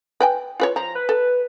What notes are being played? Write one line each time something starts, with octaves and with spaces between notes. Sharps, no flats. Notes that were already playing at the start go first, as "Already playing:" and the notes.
B4 G5 G#5
F4 B4 C#5
F3 A#5
B4
A4